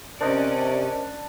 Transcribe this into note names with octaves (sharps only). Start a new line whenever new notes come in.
C3 C#4 D4 A#4 C5 D5 D#5